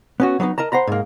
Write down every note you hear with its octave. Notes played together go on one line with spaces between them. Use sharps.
B3 C#4 F#4
F#3 B3 C#4 D#4
A#4 D#5 A5 A#5
C5 F#5 A#5 B5
G#2 A#3